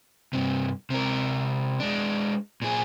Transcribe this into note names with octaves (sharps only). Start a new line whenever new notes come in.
G2 C3
C3 A#4
G#3 D4
A#2 G#4